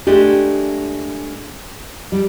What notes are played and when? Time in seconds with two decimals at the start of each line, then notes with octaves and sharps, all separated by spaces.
0.07 G#3 A3 D4 G4
2.12 G3